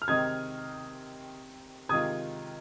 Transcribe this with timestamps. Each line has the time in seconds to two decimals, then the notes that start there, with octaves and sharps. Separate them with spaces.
0.02 F6
0.08 C3 D#3 G#3 C4 D#4 D#6 G#6
1.89 C3 D#3 G#3 F4 D#6 G#6